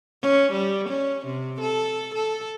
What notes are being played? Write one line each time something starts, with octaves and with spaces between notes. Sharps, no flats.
C#4
G3
C#4
C3
A4
A4